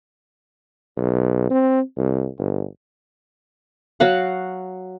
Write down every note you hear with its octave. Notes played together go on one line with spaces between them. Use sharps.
B1
C4
C2
G1
F#3 F#4 F5 F#5